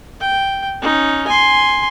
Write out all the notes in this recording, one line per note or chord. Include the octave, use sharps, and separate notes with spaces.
G5
C#4 D#4
G#5 C6